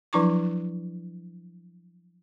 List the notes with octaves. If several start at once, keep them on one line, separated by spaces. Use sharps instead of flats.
F3 F#3 D4 E4 C#6 D6